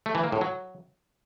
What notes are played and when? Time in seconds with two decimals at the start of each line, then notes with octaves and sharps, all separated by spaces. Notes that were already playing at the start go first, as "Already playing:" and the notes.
0.06 A3
0.15 E3
0.24 A#3
0.32 A2
0.41 F#3